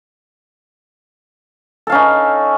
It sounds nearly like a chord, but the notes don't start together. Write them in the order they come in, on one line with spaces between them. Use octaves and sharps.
A4 F5 C#4 D#4